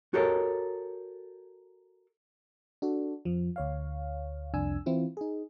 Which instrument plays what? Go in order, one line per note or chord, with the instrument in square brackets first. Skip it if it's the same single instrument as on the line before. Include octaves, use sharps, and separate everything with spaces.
[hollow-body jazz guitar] F#4 G4 A4 A#4 C#5
[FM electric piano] D4 F#4 A4
F2 F3
D2 C#5 F5
C2 F2 D4 G#5 E6
E3 C4 E4 F4
D#4 G#4